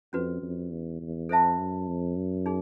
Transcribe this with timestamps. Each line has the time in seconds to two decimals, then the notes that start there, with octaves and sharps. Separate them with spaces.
0.13 F2 C#4 F#4 B4
0.42 F2
0.71 E2
1.01 E2
1.29 F2 A4 C5 E5 A5
1.58 F#2
1.87 F2
2.16 F#2
2.46 D#4 G#4